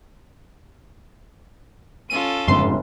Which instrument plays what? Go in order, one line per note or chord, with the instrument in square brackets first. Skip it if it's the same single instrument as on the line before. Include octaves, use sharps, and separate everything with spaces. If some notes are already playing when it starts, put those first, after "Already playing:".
[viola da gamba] C#4 F4 A4 [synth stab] D#7
[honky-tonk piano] G1 [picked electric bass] F2 G#2 C#3 [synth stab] C6